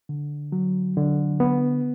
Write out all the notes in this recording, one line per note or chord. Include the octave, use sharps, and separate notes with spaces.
D3
F#3
D3
B3